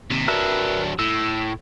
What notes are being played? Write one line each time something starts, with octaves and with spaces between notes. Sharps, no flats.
D#2 C3
F#3 D4 A#4 B4 E5
A2 E6